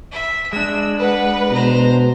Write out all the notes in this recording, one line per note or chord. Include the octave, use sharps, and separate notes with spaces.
E5
G#3 D4 E6
B4 F#5
B2 C5 A#5